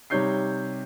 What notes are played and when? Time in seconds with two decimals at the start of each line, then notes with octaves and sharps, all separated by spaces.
0.10 C3 G3 D#4 C#5 G6 C7